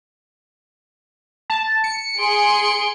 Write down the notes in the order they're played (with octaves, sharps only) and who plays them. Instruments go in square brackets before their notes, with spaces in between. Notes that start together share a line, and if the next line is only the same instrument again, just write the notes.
[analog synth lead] A5
C#7
[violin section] G#4 C6 D7